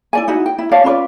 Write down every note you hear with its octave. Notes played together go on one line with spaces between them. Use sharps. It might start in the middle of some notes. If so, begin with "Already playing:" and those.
E4 D5 G#5
D#4 E4 F#4
G5
E4
C#5 D5 F5 A5
C#4 F4 B4 D5